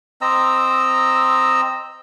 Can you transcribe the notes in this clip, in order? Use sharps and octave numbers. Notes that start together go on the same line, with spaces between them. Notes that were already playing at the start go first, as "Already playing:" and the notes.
C4 D#5 A#5 E6